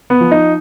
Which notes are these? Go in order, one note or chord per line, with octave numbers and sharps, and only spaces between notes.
B3
F3
D#4